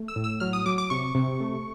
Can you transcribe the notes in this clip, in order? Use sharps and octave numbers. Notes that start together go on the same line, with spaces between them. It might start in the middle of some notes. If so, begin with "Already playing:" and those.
Already playing: A3
E6
A2
E6
F#3 F6
D#6
F#3 D6
D6
C3 C#6
C3
A3